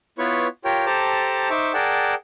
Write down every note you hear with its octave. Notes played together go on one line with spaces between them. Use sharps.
B3 E4 F4 B4 C#5 C#6
F4 G4 A#4 C#5 G5
G4 A4 C5 A5 A#5 D6
D#4 C5 E5 C#6 D6
G#4 A#4 D5 F#5 G5 A5